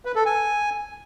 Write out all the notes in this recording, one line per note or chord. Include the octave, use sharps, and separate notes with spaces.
B4
A4
G#5